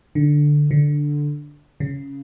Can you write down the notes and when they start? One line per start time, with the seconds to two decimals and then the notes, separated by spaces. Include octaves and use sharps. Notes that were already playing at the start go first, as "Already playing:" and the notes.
0.15 D3
0.71 D3
1.80 C#3